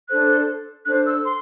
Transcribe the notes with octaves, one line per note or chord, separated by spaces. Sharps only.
D4 A4 C5 F#6
D4 A4 C5 F#6
E6
C6